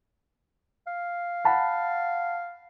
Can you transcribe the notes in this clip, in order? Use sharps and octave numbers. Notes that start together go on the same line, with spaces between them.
F5
F#5 A5 B5